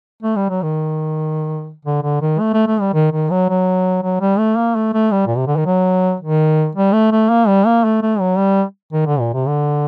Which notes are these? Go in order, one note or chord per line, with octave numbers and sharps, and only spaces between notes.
A3
G3
F#3
D#3
D3
D3
D#3
A3
A3
A3
G3
D#3
D#3
F#3
F#3
F#3
G3
A3
A#3
A3
A3
G3
A#2
C3
D3
D#3
F#3
D#3
G3
A3
A3
A#3
G3
A#3
A3
A3
F#3
G3
D#3
D3
A#2
C3
D3